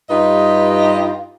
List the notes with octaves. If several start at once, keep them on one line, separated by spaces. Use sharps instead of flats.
G2 D#4 F4 G4 B4 D#5